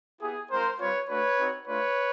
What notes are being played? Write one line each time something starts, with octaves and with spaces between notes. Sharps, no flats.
B3 E4 G4 G#4
G#3 C4 F4 A#4 C5
G3 C4 F4 B4 C#5
A3 D4 F#4 B4 C#5
C4 D#4 F#4
A3 D4 F4 B4 C#5